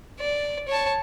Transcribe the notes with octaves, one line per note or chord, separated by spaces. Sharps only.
D5
C#5 A5